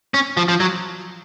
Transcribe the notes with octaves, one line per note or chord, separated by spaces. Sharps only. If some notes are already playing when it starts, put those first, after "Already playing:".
C#4
F3
F3
F#3